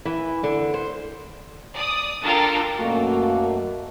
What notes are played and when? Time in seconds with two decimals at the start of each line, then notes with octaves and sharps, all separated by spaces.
0.05 E3
0.43 D3
0.74 C5
1.75 D5 D#6
2.22 D4 F4 A4 A#4 G5
2.77 F#2 B2 A3 A#3 F#4